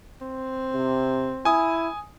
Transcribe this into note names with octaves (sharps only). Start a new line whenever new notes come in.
C4
C3
E4 G#5 D#6